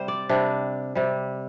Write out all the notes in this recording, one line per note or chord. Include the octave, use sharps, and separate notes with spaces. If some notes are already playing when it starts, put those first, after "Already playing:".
Already playing: C3 G3 C5
D5
C3 G3 D4
C3 G3